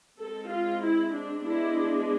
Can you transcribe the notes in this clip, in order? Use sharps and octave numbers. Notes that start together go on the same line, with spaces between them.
G#3 C4 A4
F4
E4
D4
G#3 B3 D4 E4